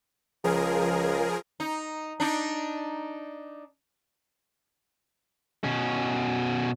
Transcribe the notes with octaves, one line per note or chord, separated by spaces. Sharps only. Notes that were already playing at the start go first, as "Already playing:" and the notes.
C#2 F3 G#4 A#4
D#4
D4 D#4
B2 C#4